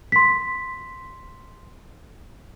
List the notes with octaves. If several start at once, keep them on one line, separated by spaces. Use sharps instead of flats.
C6 B6